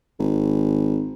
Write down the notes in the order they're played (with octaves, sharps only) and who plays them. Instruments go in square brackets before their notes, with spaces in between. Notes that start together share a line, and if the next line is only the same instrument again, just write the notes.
[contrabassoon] G#1